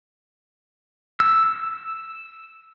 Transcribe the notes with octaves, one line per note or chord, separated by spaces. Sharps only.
E6